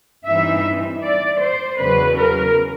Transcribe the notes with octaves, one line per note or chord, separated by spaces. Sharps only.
G2 E3 G3 C4 D#4 E5
D5
C5
E2 C#3 F#3 B4
A#4